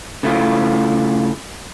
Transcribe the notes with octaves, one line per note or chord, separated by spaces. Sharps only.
C#3 A3 E4 F4